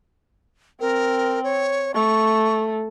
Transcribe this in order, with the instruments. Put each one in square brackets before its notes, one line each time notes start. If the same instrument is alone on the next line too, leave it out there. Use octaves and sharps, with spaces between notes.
[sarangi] C4 [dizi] A#4
[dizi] C#5
[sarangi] A3 [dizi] C#6